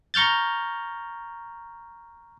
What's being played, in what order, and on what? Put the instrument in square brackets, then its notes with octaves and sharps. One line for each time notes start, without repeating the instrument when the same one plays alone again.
[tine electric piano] A#5 C#6 F6 G6 A6